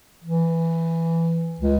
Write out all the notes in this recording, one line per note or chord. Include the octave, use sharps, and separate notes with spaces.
E3
C#2